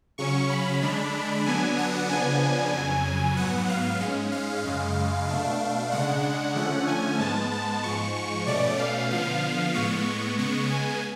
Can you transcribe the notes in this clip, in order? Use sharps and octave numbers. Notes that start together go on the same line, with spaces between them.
C#3 F#3 C#4 C#6
B5
D3 G#3 D4
D3 F#3 B3 D4 G#5
F#5
C#3 F3 B3 D4 G#5
F2 C#3 F#3 G#5
G#2 F#3 B3 F#5
F5
G#2 G#3 C#4
F5
F#2 C#3 G#3
B2 A3 D4
C#3 G#3 D4 F#5
D3 F3 A3 C#4 F#5
G#5
G#2 G#3 B3 A5
A5
G#2 F3 G#3 C#6
C#6
B2 A3 C#4 D5
F5
D3 F3 B3 F5
A2 G#3 B3 C#6
C#3 G#3 B3 C#6
G#5